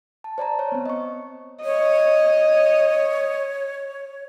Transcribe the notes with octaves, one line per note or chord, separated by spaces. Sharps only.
A5
C5 D5 A5 A#5
C5 C#5
B3 C4
D#5 C#6
C#5 D#5